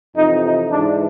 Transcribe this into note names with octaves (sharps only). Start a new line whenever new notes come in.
F2 C3 E3 D#4
D#4
G#2 E3 D4